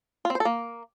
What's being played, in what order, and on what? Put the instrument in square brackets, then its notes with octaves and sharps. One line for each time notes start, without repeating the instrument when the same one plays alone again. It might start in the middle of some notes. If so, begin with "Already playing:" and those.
[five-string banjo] F4
C4
C5
A4
A#3